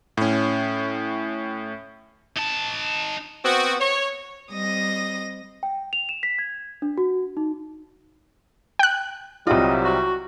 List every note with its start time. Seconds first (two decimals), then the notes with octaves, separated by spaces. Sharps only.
0.17 A2 C#4
2.37 D#4 A5
3.45 B3 C4 F#4
3.80 C#5
4.51 G3 C4 D#5 D#6 A#6
5.63 G5
5.93 F7
6.09 E7
6.23 B6
6.39 G#6
6.82 D4
6.98 F#4
7.37 D#4
8.79 G5 F#6
9.47 C2 C3 F#3 G3 F4 D#5
9.84 F#4